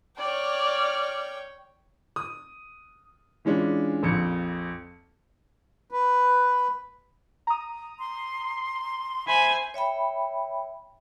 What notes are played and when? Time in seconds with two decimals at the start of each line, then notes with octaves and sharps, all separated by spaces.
0.18 C#5 D5 G5 F6
2.16 D#6
3.45 E3 G#3 C#4 D4 F4
4.03 A#1 F2 C#7
5.91 B4
7.47 A#5 D#6
7.99 C6
9.27 C5 E5 G#5 B5
9.74 C#5 E5 G5 B5